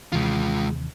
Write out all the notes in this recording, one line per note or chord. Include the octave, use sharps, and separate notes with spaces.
D#2 C3 E3 G#3 F4